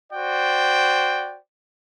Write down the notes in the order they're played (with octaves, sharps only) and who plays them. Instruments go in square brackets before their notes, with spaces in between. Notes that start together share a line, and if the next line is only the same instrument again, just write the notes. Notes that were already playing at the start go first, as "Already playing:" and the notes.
[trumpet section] F#4 C5 D5 G5